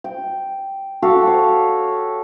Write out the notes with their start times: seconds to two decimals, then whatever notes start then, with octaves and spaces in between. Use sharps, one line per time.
0.04 G5
1.02 F#4 G4 A4 F5
1.27 C#5